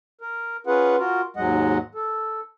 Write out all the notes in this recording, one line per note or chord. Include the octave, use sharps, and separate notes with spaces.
A#4
C#4 F4 G#4 B4 F#5
F4 F#4 A#4
D#2 G#2 F#3 G#3 D#5 F#5
A4